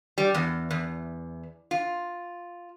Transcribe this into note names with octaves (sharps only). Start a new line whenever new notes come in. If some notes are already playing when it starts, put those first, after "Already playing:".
G3
E2
E2
F4